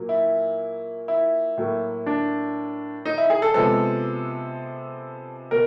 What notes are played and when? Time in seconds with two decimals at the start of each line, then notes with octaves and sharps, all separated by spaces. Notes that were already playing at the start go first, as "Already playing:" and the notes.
Already playing: A#2 F#3 A#3
0.09 E4
1.08 E4
1.58 A2 F#3 A#3
2.06 D4
3.06 D#4
3.18 E4
3.30 G#4
3.42 A4
3.54 C3 F3 G#3 B3 A4
5.51 B2 A#4